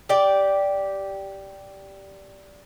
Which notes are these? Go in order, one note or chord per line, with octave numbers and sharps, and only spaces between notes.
G4 D5